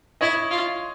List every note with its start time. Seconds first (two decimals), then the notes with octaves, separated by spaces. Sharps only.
0.21 E4 C#5 D#5
0.51 F4